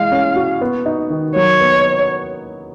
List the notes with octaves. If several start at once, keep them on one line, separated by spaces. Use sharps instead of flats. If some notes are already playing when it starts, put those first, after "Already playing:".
Already playing: E3 G#3 F5
C#4
F#4
B3
D#4
D#3
F#3 C#5
B3